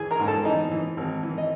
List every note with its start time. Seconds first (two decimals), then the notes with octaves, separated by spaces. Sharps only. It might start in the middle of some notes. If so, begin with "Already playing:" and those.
Already playing: E3 G#4 G#5
0.11 A#4 A#5
0.20 G#2
0.28 A4 A5
0.45 E3 D#4 D#5
0.71 E3
0.97 G#1
1.23 E3
1.38 D#5